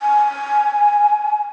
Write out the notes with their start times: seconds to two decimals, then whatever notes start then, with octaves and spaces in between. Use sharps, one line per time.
0.01 G#5